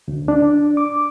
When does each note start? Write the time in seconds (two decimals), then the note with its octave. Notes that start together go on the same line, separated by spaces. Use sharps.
0.08 D2
0.28 D4
0.77 D6